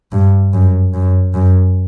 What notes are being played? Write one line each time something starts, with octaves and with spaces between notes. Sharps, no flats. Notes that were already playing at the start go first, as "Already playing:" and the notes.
G2
F#2
F#2
F#2